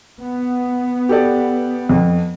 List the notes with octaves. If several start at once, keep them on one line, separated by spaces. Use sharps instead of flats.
B3
G4 A4 D5
F2